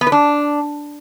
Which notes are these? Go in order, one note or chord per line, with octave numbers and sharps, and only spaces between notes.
B3
B4
D4